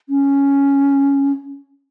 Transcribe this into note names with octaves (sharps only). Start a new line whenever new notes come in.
C#4